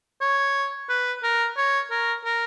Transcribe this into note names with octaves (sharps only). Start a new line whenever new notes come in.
C#5
B4
A#4
C#5
A#4
A#4